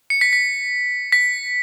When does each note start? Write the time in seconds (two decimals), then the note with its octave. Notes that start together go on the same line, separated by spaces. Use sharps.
0.10 C#7
0.21 B6
0.33 B6
1.12 B6